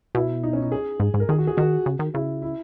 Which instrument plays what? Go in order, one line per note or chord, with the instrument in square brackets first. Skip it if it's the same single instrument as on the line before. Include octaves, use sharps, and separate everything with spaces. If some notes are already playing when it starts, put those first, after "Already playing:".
[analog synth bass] B2 [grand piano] E4
[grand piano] D#4
C#4
D#4
G#4
[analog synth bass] G#2
G#2
[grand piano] A#4
[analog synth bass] D#3 [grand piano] G#4
[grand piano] F#4
G#4
[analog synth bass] D#3 [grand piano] F#4
[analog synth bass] C#3
D#3
[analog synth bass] C#3 [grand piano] E4
[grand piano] E4